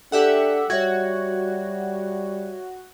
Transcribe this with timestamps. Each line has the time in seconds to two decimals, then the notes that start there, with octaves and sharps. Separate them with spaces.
0.12 D4 G4 A4 E5 F#5
0.70 G3 F#4 C#5 E5 G#6